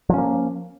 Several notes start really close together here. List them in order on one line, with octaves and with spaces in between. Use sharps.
F3 C#4 A#3